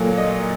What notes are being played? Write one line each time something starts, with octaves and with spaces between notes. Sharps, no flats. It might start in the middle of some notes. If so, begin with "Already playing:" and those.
Already playing: A#2 F#3 A#3 A4
D#5